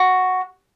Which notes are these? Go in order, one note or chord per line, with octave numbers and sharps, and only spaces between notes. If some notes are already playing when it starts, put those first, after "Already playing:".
Already playing: F#4